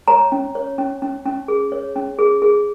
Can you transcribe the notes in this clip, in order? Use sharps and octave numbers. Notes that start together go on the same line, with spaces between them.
C#5 A#5
C#4
C#5
C#4
C#4
C#4
G#4
C#5
C#4
G#4
G#4